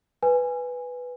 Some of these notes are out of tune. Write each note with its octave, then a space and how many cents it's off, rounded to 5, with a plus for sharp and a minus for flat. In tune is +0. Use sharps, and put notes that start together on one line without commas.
B4 +0 G#5 -10